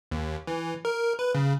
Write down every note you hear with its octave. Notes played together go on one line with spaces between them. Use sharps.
D#2
E3
A#4
B4
C#3